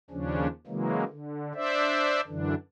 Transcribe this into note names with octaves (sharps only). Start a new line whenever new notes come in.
D#2 C#3 F3 C#4 D4
C#3 E3 F#3 G#3 A#3
D3
D4 C5 D5 E5
F#2 D3 E3 D4